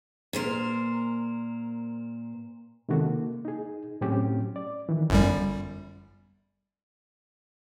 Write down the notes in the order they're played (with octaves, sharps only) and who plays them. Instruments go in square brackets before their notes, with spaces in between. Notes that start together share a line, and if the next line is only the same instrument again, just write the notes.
[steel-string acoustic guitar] A#2 A#4 C5
[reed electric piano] C3 D#3 G#3 C#4 F#4 A4
A#3
D#4 G#4
A2 F#3 C4 C#4 G4
D5
D#3 E3
[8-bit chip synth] G1 F#2 G3